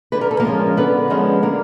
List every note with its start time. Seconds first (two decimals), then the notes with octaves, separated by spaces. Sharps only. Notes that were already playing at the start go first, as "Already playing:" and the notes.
0.12 D3 B4
0.21 A#4
0.31 A4
0.40 A#3 A#4
0.45 F3 G#3 C#4
0.77 D3 B3 B4
1.10 F3 G#3 C#4
1.43 D3 A#3 A#4